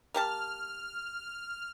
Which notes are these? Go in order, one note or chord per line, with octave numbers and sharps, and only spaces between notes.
A#3 G4 A5 F6